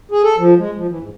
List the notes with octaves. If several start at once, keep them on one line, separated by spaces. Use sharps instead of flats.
G#4
A4
F3
G#3
F3
E3
G#2